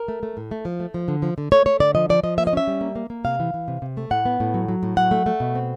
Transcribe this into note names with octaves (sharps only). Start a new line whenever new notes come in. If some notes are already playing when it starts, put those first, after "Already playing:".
Already playing: A#4
A3
A3
A2
A3
F3
A3
F3
D3
F3
D3
A3 C#5
A3 C#5
D3 D5
F3 D#5
F3 D5
F3 D#5
A#3 E5
D#5
C#4 E5
G3
A#3
A#3
A#3
C3 F5
E3
E3
C3
C3
A3
A2 F#5
B3
A2
F#3
F#3
A2
F#3 F#5
A3
A3
B2
C4